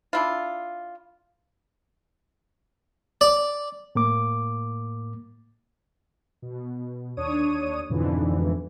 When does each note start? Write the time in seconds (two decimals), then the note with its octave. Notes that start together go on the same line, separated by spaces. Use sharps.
0.13 D4 E4 F4
3.21 D5
3.95 A2 A#3 D6
6.42 B2
7.17 D#2 D4 C#5 D#6 D#7
7.89 F2 G#2 B2 D3 E3 F3